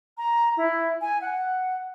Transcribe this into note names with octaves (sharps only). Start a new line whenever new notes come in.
A#5
E4
G#5
F#5